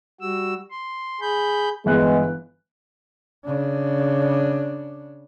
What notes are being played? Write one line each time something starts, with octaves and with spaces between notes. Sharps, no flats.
G3 F#4 E6
C6
G#4 B5 G6
G1 E3 G#3 B3 E4 F#6
C#3 D4